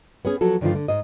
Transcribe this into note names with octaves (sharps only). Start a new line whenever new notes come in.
B3 C#4 G#4
F3 F#3 F#4 A4
G2 D3 D#3 F3 A3 F4
D3
G#2 D#5